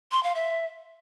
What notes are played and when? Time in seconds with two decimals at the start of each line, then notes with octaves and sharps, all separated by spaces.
0.12 C6
0.23 F5
0.35 E5